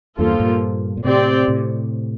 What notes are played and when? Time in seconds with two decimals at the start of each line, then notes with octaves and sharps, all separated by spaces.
0.18 E2 G2 F3 A#3 F4 A4
0.40 G2 A#2
0.97 A#2
1.04 A2 C3 C4 G4 D5
1.48 A2 C3